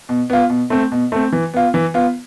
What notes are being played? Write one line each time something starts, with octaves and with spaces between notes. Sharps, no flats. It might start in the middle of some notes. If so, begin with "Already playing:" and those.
B2
B3 F4
B2
A3 C4
B2
A3 C4
E3
B3 F4
E3
B3 F4